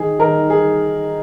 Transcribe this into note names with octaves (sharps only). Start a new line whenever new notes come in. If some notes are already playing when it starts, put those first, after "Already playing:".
Already playing: D#3 G#4
D#3 A#4
G#4